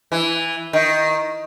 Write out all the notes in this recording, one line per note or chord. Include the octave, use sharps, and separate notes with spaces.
E3
D#3